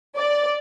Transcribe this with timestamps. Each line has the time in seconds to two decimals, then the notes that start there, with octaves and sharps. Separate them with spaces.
0.17 D5